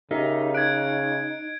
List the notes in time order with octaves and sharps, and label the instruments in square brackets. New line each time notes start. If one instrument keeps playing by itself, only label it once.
[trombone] C#3 [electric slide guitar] D#4 [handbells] G4 A#4 E5
[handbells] F#6 [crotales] G#6 D7